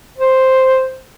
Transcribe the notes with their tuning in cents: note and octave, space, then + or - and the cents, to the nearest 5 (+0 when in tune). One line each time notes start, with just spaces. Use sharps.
C5 +0